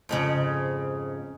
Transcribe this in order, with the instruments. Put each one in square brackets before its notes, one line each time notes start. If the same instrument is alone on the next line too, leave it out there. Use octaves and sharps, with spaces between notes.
[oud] F2 G#2 C#3